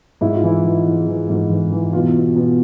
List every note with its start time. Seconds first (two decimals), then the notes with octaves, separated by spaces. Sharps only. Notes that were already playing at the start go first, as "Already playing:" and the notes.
0.21 G#2 E4
0.35 F4
0.43 E3 E4
0.64 E3
0.85 E3
1.08 E3
1.29 G#2
1.50 E3
1.72 E3
1.93 B2 F4
2.15 B2
2.36 B2